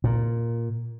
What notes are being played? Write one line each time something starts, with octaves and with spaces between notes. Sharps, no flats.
A#2